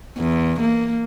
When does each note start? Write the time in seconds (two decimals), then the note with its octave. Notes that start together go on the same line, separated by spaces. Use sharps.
0.17 E2
0.60 A#3